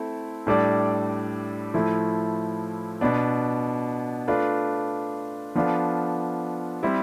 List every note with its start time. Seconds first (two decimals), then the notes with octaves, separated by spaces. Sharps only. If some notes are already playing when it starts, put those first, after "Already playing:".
Already playing: A3 C4 E4 A4
0.47 A2 G3 D4 A4 D5
1.74 A2 F3 A3 E4
3.01 B2 B3 D4
4.28 A3 D4 F4 B4
5.55 F3 B3 D4 F4 A4
6.83 G3 C4 E4